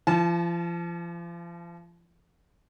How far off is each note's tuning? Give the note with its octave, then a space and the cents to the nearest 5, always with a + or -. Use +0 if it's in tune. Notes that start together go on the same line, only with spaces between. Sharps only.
F3 -35 A5 -20